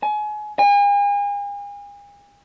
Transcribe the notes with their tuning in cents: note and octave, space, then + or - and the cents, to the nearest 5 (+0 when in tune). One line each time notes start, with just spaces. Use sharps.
G#5 +30
G#5 -40